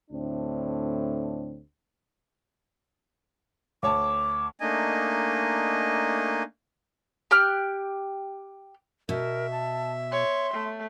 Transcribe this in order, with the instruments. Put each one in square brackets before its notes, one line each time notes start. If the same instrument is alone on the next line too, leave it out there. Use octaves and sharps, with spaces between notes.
[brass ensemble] D2 A2 C4 D4
[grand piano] D2 C#5 A5 [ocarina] D6
[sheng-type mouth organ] A3 A#3 D4 D#4 D#5 G#5
[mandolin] G4 G5 F6 F#6
[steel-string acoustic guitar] B2 [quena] A#4 [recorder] E5
[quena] A5
[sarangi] C#5 [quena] C6
[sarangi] A3